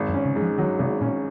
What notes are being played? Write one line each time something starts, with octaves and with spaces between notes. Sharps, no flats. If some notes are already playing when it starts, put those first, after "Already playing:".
Already playing: G#1
F#2
C#4
C#3
G#2
F3
D#3 F#3
G#1 C3
A#2 C#4